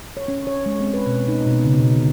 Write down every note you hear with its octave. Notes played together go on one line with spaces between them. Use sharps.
C#5
C#4
C#5
G#3
C4
B4
B2
D#4
B2
C#3
B2
D3